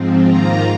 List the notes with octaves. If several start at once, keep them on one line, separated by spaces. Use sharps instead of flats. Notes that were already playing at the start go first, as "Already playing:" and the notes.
Already playing: G#2 F3 C4
G#2 D#3 A#3 F4 A#5